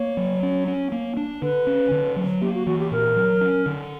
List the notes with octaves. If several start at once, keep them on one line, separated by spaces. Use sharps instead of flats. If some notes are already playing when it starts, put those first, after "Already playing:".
Already playing: A#3 C#5
F#3
C#4
C#4
A#3
D4
D3 B4
C#4
D3
F#3
A#3 G4
F#4
E3 F#4
G4
A#2 A#4
F#3
C#4
D3